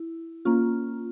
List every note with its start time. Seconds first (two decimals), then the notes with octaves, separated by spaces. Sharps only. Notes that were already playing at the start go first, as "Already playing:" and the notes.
Already playing: E4
0.45 A#3 C#4 F4